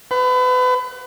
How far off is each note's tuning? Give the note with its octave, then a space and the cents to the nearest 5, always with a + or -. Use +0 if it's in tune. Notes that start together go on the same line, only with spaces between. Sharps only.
B4 +30